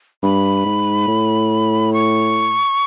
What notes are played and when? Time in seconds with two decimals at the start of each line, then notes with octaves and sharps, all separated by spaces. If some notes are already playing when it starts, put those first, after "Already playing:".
0.23 G2 B5
0.65 G#2
1.08 A2
1.93 C#6